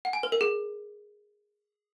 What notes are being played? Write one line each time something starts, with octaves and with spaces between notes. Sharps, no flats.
F#5
G#5
B4
A#4
G#4